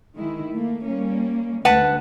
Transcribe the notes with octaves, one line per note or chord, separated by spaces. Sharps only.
D#3 G#3 E4
A3 A#3
G3 A#3 C#4
D2 G#3 B4 F#5 A5